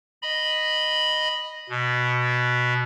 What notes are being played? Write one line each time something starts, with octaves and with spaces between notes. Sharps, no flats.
D#5 B5
B2